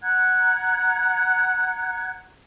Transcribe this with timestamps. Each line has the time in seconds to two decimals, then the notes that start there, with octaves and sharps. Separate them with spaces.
0.02 F#5 A#5 F#6 G#6